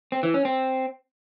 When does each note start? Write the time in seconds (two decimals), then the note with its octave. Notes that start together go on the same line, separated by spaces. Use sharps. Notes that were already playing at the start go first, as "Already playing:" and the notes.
0.12 C4
0.23 E3
0.34 C#4
0.45 C4